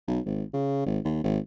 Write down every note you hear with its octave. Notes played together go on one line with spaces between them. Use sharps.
B1
G#1
C#3
G#1
D#2
G#1